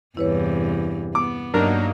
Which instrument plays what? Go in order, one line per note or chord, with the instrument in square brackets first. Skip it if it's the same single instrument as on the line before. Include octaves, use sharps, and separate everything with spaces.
[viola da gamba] E2 G2 C3 [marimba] E4 B4 C#5
[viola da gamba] B3 [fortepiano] D6
[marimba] G2 [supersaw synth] F#3 A#3 D#4 [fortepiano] D4 A#4